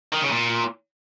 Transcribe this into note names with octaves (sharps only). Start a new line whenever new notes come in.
D#3
C#3
A#2